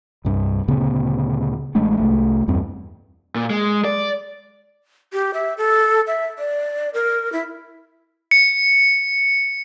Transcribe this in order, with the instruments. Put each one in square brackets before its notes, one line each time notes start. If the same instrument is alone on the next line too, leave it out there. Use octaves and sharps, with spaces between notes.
[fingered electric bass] C2 G2 D4
D2 A#2 C#3 B3
A1 G#3 A3 D4
C2 F2 A3
E2 G2 C4
[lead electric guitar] A#2
G#3
D5
[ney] G4
E5
A4
E5
D5
A#4
E4
[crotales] C#7